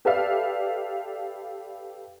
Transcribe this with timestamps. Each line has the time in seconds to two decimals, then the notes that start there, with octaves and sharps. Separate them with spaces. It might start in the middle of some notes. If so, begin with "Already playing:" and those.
0.05 G4 A4 B4 D5 E5 F5